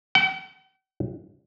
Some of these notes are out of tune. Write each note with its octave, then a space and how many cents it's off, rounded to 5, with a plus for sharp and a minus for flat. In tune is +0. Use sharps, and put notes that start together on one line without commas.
G5 -45